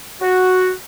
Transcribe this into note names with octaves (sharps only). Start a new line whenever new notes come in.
F#4